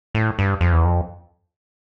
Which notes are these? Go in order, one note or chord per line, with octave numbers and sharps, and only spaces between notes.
A2
G2
F2
E2
F2